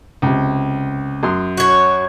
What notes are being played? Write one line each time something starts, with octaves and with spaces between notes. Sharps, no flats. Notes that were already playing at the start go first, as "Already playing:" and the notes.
C#2 C3
F#2 C6 D#6
F#4 C#5